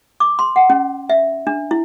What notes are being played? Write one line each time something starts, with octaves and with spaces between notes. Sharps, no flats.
D6
C6
F#5
C#4
E5
D4
E4